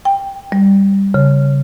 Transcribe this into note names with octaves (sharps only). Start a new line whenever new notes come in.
G5
G3
C#3